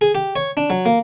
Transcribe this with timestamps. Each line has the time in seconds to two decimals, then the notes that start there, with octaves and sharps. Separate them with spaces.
0.01 G#4
0.15 G4
0.36 C#5
0.57 D4
0.70 F#3
0.86 A#3